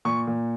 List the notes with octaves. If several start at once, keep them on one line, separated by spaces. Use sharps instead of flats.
A#2 C#6
A#2